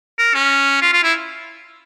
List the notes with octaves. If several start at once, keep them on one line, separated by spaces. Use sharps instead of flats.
A#4
C#4
F4
F4
E4